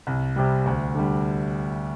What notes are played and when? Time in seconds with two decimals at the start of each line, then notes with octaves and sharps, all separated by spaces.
0.07 C2
0.36 C3 G3
0.66 D2
0.95 D3 G3